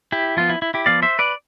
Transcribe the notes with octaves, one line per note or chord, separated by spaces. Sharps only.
E4 G4
F3 B3 F4
E4
E4
E4 G4
F3 B3 D5 F5
C5 E5
B4 D5